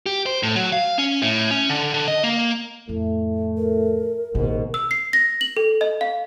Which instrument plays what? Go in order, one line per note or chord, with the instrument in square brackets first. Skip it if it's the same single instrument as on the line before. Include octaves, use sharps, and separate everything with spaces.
[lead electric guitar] G4
C5
A2
F#3
F5
C#4
A2
C#4
D3
D3
D#5
A#3
[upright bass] F2 [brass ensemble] A2 A3
[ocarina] A#4
[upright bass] A1 B2 [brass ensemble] D#2 G#2
[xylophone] E6
C7
A#6
F#7
A4
D#5
F5